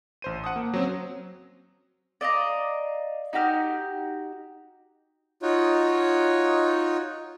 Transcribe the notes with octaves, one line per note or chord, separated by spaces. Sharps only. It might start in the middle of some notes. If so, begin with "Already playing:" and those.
A1 C5 D#7
F#5 A5 D#6
A#3
F#3 C4 C#4
D5 D#5 F5 A#5
D#4 F#4 G4 F6
D#4 F4 F#4 C#5